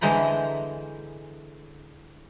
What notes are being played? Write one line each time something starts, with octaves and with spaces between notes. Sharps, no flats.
D3 E3 G#3 C5 A#5 B5